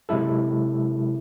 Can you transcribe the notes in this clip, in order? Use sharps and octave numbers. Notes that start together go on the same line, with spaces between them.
C3 F#3 G#3 E4 A4